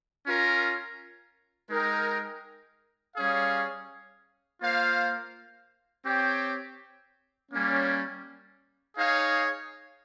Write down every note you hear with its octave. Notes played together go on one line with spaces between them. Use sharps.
C#4 F4 A#4
G#3 D#4 A#4 D#5 G5
G3 C#4 G#4 C#5 F5
A#3 F4 C5 F5
C4 G4 C#5 G5
G3 A#3 C#4
D#4 G#4 C#5 F5